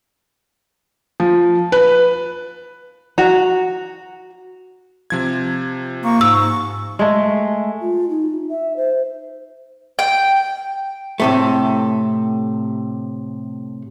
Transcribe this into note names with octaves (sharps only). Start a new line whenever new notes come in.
F3
B4
F#4 A#5
C3 F3 G#6
A#3 C#6
G#2 E6
G#3 A3
F4
D#4
E5
C5
G5
A2 C3 A3